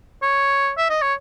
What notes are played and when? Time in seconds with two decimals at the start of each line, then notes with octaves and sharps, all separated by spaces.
0.22 C#5
0.77 E5
0.90 D#5
1.02 C#5